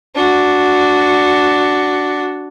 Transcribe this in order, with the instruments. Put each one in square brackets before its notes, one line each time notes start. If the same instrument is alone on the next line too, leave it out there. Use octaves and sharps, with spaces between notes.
[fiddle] D4 F#4